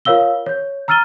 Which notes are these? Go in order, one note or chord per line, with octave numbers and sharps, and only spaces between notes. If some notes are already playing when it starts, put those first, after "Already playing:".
F4 A#4 C#5 F5 E6 G7
C#5 G6
A#5 E6 F6 A6 D#7 G7